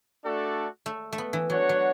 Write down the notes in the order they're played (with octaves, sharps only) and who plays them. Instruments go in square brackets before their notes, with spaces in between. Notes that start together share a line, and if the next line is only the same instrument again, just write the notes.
[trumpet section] A3 D4 F#4 A4 D5
[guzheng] A3
A3
B3
E3
[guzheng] F#3 [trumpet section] D4 F#4 C#5 F#5
[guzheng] F#3